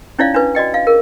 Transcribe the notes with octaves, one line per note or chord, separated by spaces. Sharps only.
C#4 D#4 E4 C#5 D5 F5
D4 E4 B4
F#4 D5 D#5 G5
F5
G#4 A#4